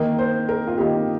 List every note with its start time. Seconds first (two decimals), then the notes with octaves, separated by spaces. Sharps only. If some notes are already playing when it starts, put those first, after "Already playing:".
Already playing: D#3 A#3 D#4
0.19 C5
0.49 A#4
0.67 F4
0.78 D#3 A#3 D#4 G4